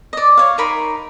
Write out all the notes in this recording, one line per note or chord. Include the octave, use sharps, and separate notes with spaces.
D5 D#5
C#5 F5
D#4 A#4 B5 C6